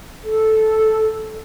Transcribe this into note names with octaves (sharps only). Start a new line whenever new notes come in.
A4